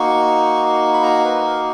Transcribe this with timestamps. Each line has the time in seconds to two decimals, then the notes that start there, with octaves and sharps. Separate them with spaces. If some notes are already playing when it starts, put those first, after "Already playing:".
Already playing: A#3 D#4 F#4 C#6
0.94 B5
1.03 A#5
1.25 B4
1.46 A#4